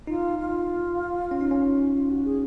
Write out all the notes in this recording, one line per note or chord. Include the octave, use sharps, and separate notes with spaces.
D#4 F4
F4
C#4
D#4
C#4
F4
F#4
G#4